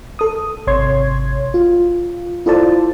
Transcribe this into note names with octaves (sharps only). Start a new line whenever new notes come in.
A4 D#6
G#1 C3 C#5 C6 G#6
F4
E4 F4 A4 C5 D5 A5